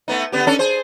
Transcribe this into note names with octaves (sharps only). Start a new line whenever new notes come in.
A3 B3 D#4
D3 B3 G4
C#4 D4 A4
G#4 C5